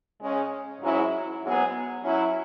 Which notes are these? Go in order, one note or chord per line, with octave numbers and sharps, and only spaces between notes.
C#3 G#3 C#4
G#2 F#3 C#4 E4 G#4
G#2 F#3 B3 G#4
F#3 C#4 E4